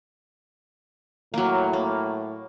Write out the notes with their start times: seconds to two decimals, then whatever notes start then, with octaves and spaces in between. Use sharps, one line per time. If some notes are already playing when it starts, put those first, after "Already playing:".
1.34 A2 F#3 A#3
1.73 A#3